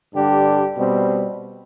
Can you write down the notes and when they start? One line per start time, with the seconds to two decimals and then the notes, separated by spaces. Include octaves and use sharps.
0.14 G2 D3 G3 D4 G4
0.78 B2 G3 C4